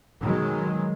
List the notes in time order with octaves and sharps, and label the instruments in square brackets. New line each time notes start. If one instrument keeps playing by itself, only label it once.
[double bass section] B2 D#3 F#3 G#3